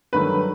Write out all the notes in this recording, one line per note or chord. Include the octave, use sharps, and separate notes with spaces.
G2 D#3 F#3 A3 B4